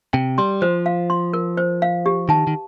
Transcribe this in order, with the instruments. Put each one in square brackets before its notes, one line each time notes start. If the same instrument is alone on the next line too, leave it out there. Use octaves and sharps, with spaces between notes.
[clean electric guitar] C3 [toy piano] G5
[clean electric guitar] G3 [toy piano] C6
[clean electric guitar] F3 [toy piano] C5
[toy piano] F5
C6
A#4
C5
F5
G4
[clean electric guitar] D#3 [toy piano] A5
[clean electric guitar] D#3